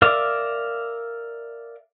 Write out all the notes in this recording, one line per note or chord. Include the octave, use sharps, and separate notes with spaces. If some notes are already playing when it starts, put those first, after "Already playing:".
A#4 D5 E5 F5 D6